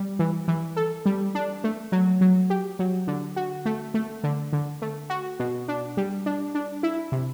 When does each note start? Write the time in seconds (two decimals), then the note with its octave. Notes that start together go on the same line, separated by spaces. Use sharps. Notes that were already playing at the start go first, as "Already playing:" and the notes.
Already playing: G3
0.19 E3
0.48 E3
0.76 A4
1.06 G3
1.35 D4
1.64 A3
1.92 F#3
2.21 F#3
2.50 G4
2.79 F#3
3.07 D3
3.36 F#4
3.65 A3
3.94 A3
4.24 D3
4.53 D3
4.82 A3
5.10 F#4
5.39 B2
5.68 D4
5.97 G3
6.26 D4
6.55 D4
6.83 E4
7.12 C3